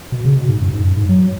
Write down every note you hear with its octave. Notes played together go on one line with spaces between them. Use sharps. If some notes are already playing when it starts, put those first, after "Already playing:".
B2
C#3
B2
G#2
F#2
G#2
F#2
G#2
F#3